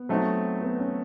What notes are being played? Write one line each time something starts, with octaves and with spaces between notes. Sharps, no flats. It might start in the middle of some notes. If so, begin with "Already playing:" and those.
Already playing: B3
F#3 A3 C4 D#4
B3
C#4